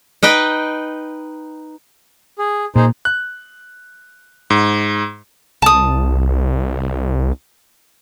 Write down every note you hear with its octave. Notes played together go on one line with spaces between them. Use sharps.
D#4 B4 D#5 G5
G#4
A#2 D#4 G#4 C5
F#6
G#2
C2 A5 D#6